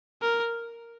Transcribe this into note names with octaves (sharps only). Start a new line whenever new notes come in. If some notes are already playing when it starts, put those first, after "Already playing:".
A#4